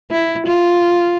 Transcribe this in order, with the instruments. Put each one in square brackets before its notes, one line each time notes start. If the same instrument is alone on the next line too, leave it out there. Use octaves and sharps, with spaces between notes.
[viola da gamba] E4
F4